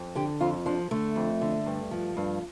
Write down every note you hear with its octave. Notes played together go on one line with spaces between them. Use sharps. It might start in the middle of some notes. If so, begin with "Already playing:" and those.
Already playing: F2
D3 G4
F2 F4
F3 D4
D3 A3
F2
D3
G2
F3
G2